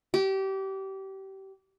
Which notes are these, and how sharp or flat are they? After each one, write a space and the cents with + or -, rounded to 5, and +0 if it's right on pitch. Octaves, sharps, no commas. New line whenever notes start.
G4 -25